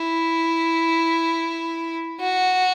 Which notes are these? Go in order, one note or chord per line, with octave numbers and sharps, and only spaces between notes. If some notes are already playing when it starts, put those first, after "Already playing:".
Already playing: E4
F#4